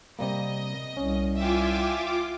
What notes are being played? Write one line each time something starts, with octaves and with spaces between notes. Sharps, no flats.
C3 G3 A#3 D#5
C2 C#4
F4 E5 G5 G#5 D6